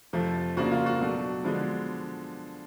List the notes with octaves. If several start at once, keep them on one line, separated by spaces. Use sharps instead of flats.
F2 C3 F3 A3
C#3 F3 A#3 D4 F#4
F4
F#4
B2 F#3 A3 D4
D3 F3 G#3 B3 D4